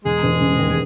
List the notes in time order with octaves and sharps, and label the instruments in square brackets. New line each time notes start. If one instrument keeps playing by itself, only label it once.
[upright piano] E1 [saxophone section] G#3 G#4
[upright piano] E1
C#3
D#2